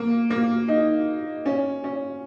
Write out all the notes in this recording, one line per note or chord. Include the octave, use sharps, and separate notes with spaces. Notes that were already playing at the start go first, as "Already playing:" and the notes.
Already playing: A#3
A#3
D#4
C#4
C#4